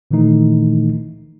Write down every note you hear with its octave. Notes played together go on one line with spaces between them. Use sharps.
A#2 D#3 E3 A3 D#4